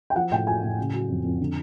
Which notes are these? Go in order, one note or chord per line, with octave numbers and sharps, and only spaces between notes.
G5
F3 F#5
A2 G5
F3 G#5
A2
C#3
F#3
F2
F2
D3